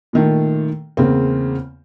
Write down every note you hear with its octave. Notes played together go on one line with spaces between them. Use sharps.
A#2 D#3 A3
E2 C#3 A#3 C4